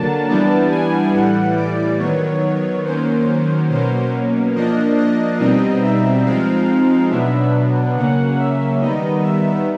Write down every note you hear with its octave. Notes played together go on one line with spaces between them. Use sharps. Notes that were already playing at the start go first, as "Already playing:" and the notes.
Already playing: D3 F#3 A#3 A5
E3 G3 B3 D4
G#5
A2 E3 G3 F#5
D5
D#3 F#3 B3 C#5
D#3 F#3 A#3 C#4 C5
B2 F#3 A#3 C#4 C5
F3 A#3 D4 D#5
D#5
B2 G3 C4 D#4
E5
F3 G#3 C4 D#4 F5
B2 F#3 B3 D4 E5
C#3 F#3 A#3 C#4 F#5
E5
D#3 G3 B3 D#4 D#5
E5